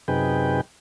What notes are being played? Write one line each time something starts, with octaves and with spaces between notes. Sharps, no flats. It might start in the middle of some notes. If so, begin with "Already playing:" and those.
F#2 C3 D#4 G#4 B4 G5